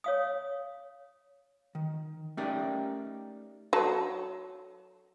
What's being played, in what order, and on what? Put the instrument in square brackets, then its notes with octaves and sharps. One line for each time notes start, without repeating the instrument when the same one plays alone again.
[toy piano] C#5 F5 D#6
[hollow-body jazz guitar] D#3
A3 C#4 D#4 G4 A#4 D5
[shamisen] F#3 A4